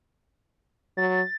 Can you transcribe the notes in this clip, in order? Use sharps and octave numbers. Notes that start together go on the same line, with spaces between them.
F#3 A6